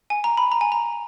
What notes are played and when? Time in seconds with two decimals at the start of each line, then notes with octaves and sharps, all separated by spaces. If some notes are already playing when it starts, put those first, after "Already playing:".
0.10 G#5
0.24 A#5
0.37 B5
0.52 A#5
0.61 G#5
0.72 A#5